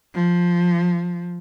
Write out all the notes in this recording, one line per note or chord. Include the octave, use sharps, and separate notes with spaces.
F3